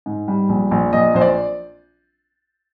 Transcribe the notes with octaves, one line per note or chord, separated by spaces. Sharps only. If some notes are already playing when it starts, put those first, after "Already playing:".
G#2
G3
A#1
A#1
A#1 D#5
A#1 C5
D5